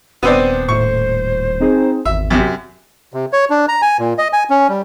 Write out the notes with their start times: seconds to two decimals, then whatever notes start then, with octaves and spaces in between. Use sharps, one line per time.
0.23 D#1 B3 C4 D4 C5 D#7
0.69 A2 C#6
1.60 C4 D#4 G#4
2.05 G#1 E2 E5
2.30 F#2 C3
3.14 C3
3.33 C#5
3.50 D4
3.68 A#5
3.82 G#5
3.99 A#2
4.18 D#5
4.33 G#5
4.50 C#4
4.69 G3